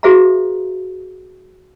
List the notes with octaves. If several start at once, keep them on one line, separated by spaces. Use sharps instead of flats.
F#4 G#4 B4 E5 F5 A#5